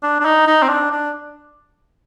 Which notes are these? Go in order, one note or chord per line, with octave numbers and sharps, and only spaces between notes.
D4
D4
D#4
D#4
C4
D4
D4